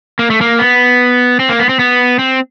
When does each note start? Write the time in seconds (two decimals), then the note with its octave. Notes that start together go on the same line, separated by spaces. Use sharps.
0.19 A#3
0.30 A3
0.41 A#3
0.59 B3
1.39 C4
1.49 A#3
1.59 B3
1.69 C4
1.79 B3
2.19 C4